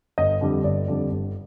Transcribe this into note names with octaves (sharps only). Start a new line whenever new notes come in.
G1 D#5
F2 D3 G3
G1 D5
F2 D3 G3
G1